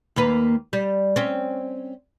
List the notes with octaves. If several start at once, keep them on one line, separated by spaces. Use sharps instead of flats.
D#2 A#3 B4
G3
C4 C#4